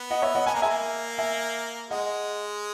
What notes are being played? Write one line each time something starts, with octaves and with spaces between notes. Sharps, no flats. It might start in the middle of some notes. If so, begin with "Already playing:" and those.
Already playing: B3
D#5 F#5
C#5 E5
D#5 F#5
B3 G#5
A#3 A#5
G#3 E5 G#5
A#3
E5 G#5
G#3 D#5 F#5